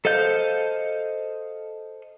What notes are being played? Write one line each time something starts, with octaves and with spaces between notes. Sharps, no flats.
A4 C5 D#5 F5 G6